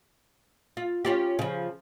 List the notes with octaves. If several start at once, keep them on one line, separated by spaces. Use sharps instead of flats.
F4
C#4 F4 G4
C#3 F3